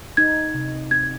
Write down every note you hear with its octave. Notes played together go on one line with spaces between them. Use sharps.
D#4 G#6
C3
C4 G#6